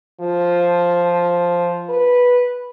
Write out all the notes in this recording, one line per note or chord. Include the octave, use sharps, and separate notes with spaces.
F3
B4